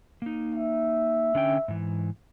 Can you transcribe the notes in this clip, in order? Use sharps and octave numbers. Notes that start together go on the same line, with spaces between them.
A#3 D#4
E5
D3 C#4 G5
G#2 E3